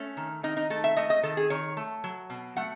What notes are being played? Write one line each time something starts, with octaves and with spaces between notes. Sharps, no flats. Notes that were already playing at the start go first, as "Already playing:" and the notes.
Already playing: A3 C#4
D#3
D#3 D#4
D#4
A3 A4
E5
A3 D#5
D#5
D#3 A4
G#4
D#3 C#5
A3
F#3
B2
A3 F#5